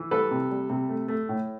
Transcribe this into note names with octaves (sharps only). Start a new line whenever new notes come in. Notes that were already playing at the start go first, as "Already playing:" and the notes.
Already playing: E3
G3 A4 B4
C3
G3
C3
A3
A3
A2